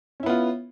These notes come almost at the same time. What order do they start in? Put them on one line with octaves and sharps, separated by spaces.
C#4 E4 B3 F4